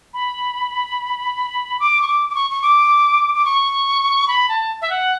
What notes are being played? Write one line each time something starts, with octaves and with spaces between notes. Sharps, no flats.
B5
D6
C#6
D6
D6
C#6
C#6
D6
D6
C#6
B5
A5
E5
F#5